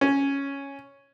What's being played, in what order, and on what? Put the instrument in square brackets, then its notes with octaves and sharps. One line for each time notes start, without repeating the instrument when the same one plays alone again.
[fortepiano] C#4